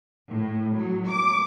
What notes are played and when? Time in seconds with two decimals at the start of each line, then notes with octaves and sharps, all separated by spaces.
0.30 A2
0.75 F#3
1.08 D6